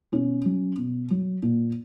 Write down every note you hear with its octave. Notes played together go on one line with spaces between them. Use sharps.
B2 C#4
F#3
B2
F#3
A#2